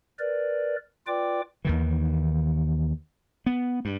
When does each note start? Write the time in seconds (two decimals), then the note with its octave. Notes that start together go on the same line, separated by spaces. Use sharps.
0.19 A#4 B4 D5
1.07 F4 B4 D5 G5 D6
1.65 D#2 D#3 E3
3.46 B3
3.85 G2